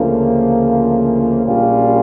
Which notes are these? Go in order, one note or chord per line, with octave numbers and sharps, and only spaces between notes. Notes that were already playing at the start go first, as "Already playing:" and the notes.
Already playing: D2 C#3 F3 A#3
A#1 A#2 G3 C#4 F4